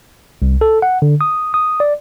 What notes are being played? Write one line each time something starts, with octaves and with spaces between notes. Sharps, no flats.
C2
A4
F#5
D3
D#6
D#6
D5